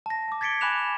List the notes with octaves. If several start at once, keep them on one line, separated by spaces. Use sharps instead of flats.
A5 A#6
A5 D6
G#6 A6 B6 C#7 D7 G7
G#5 B5 D6 F#6 E7 F7